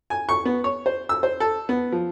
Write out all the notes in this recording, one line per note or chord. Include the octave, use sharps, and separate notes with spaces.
G#5
C#6
B3
C#5
C5
E6
C5
A4
B3
F3